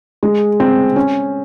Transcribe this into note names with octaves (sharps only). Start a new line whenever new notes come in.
G#3
C4
C#4